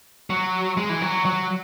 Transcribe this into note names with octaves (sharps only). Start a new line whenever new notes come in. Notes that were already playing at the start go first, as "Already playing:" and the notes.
F#3
G#3
E3
F#3
F#3